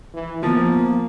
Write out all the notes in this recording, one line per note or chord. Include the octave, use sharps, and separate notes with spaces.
E3
F3 A#3 B3